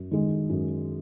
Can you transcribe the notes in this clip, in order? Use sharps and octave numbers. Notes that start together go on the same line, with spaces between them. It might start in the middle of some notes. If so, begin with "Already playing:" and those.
Already playing: F#2
D#3 G#3
F#2